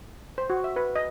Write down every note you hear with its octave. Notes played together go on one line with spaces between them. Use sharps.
C5
F#4
E5
B4
D#5